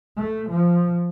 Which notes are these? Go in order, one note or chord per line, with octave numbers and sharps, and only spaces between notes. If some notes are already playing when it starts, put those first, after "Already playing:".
A3
F3